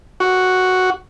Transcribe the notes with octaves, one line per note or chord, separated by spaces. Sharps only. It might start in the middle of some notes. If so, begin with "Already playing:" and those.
F#4